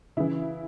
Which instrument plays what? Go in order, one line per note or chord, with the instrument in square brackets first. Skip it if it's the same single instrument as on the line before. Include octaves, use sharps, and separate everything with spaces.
[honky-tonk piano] C#3 E3 E4